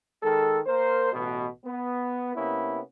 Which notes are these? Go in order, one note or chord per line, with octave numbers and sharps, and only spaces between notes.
D#3 G#3 A4
A#3 A#4 C5
A1 B2
B3
C3 A#3 B3 C#4 E4